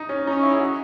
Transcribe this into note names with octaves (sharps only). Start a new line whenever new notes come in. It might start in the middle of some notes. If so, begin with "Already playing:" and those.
Already playing: D#4
C#4
C#4 D#4
E4
G#4
F#4